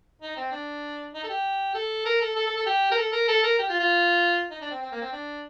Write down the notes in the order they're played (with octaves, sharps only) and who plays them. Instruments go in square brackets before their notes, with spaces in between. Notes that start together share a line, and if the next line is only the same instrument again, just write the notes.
[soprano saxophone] D#4
C4
D4
D#4
A4
G4
A4
A#4
A4
A4
A4
A4
G4
A#4
A4
A#4
A4
A#4
G4
F4
F4
D#4
D4
C4
C4
A#3
C4
D4